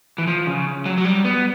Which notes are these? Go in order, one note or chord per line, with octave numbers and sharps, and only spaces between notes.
E3
F3
C#3
F#3
F#3
G3
B3